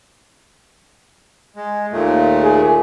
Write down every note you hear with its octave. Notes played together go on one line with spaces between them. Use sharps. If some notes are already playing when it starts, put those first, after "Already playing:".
G#3
D#2 A#2 A3
G#4